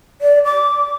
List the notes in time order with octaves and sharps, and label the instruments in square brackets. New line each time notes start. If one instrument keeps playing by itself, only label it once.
[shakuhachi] D5
D6